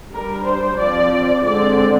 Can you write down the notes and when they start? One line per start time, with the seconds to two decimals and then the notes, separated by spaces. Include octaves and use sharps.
0.11 G3 D4 A#4
0.45 C5
0.78 F3 C4 D5
1.45 D3 G#3 C4 D5